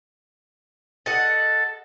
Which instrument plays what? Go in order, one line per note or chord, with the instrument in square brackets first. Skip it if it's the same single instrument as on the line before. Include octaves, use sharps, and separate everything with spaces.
[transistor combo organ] A4 [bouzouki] D#5 F#5